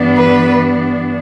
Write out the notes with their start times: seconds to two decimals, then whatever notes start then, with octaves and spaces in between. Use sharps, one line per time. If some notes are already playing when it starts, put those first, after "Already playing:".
Already playing: G2 E3 B3 D4
0.16 B4